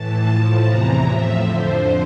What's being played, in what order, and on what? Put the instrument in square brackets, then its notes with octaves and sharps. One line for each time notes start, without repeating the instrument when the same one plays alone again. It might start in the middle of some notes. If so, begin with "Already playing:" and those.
Already playing: [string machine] A2 E3 A5
A2 F3
E2 C3 E3 A#5
A2 F3 E5
F2 D3 F3 C5